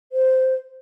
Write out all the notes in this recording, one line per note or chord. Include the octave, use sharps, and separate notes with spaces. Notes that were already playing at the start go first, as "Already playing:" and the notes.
C5